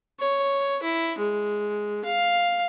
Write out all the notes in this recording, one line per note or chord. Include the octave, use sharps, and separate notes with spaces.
C#5
E4
G#3
F5